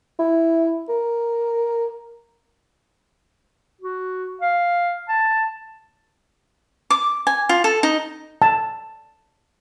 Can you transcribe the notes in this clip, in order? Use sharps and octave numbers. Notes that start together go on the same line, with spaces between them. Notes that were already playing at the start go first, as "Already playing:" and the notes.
E4
A#4
F#4
F5
A5
D6
G#5
F4
A4
D#4
A5